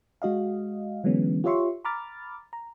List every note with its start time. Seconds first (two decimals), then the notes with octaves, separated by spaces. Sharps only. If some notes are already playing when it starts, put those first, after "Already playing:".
0.22 G#3 F#4 D#5 F5
1.04 D3 E3 F#3 G#3 B3 C#4
1.44 F4 G4 C#5 E5 C6 C#6
1.85 A#5 B5 D6 F6 A6
2.53 A#5